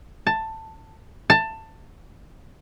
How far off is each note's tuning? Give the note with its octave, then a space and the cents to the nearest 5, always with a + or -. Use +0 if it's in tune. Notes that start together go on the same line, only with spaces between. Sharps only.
A5 +10
A5 +15